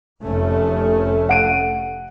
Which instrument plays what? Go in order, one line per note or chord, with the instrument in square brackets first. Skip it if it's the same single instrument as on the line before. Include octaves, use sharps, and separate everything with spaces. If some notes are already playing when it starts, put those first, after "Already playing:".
[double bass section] F1 A3 C#4
[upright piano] F#5 D7 D#7